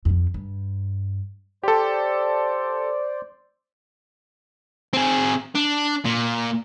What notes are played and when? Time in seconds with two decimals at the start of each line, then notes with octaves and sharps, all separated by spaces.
0.05 F2 F3
0.34 G2
1.63 G4 A4 C5 D5
4.93 C4 G#4
5.55 D4
6.05 A#2